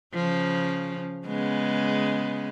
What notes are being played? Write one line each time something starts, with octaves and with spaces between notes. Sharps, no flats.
C#3 F3
C#3 G#3 B3